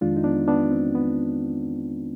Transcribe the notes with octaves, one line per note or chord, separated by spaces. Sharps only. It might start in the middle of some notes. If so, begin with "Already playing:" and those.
F2 D#3 G#3 D4 F4
D#4
B3 D4
B3 D4
C4
B3